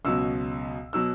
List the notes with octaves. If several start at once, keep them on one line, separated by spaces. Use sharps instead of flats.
C#2 B2 F#3 E6
B2 F#3 E6